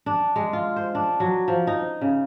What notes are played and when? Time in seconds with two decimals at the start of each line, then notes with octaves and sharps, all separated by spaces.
0.06 D4
0.36 G#3
0.53 F4
0.76 C5
0.95 D4
1.20 F#3
1.48 F3
1.67 D#4
2.01 C#3